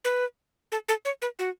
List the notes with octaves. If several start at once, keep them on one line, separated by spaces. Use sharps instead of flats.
B4
A4
A4
C#5
B4
F#4